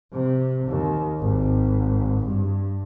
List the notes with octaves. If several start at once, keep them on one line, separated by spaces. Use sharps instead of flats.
C3
D#2
G#1
G2